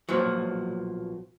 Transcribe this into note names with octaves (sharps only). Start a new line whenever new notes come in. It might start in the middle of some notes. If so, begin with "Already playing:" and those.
B1 A#2 F3 F#3